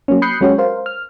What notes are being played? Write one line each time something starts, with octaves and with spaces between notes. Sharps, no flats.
F#3 A#3 C#4
B5 D#6 F#6 G6 C7 C#7
F#3 G#3 C#4 F#4 G4 C#5
A#4 C5 F5
F6